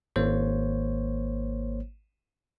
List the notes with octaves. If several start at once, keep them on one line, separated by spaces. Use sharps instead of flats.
G#1 A#3 C5 C#5